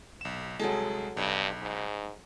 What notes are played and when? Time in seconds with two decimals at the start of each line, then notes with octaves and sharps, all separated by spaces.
0.21 B1 E7
0.59 C2 F#3 G#3 G#4 A4
1.17 B1 G2
1.62 G#2